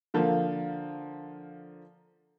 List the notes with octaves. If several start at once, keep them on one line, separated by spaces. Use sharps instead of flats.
D3 F3 A#3